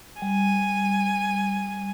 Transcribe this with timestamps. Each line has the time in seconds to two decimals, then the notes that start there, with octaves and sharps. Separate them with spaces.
0.22 G3 G#5